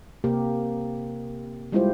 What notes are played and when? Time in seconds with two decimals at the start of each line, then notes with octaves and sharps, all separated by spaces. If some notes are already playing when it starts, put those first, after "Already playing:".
0.24 C3 A#3 G4 A#4
1.72 G3 G#3 E4 F4 G4 C5